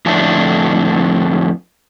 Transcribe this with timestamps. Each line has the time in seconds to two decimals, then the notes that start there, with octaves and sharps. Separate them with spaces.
0.06 F2 A2 D3 D4 E5